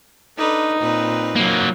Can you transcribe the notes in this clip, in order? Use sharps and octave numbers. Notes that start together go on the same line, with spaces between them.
D4 D#4 A4 B4
A#2 C4 B4
F#3 A#3